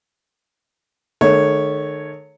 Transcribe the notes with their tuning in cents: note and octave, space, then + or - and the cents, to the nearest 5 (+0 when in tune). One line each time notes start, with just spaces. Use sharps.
D#3 -40 A3 -30 C#5 +0